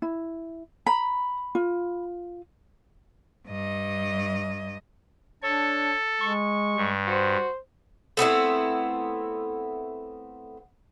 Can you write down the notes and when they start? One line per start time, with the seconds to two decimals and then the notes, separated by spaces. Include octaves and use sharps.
0.02 E4
0.87 A#5 B5
1.55 F4
3.47 G2 D#5
5.43 D4 A4 C#5
6.21 G#3 C#6
6.76 G2
7.07 F#4 C5
8.17 A3 B3 C4 E4